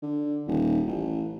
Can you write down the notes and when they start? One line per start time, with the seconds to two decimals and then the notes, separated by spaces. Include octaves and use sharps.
0.03 D3
0.48 D#1
0.87 A1